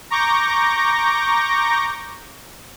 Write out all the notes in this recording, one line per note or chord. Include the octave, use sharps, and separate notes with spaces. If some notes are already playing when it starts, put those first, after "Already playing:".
A#5 C#6 D6 G6 A#6